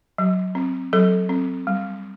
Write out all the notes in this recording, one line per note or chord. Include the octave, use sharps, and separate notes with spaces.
F#3
C4
F#3 A4
C4
G3